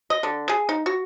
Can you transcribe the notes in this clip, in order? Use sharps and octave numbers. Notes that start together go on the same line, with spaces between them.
D#5
D3
G#4
D#4
F#4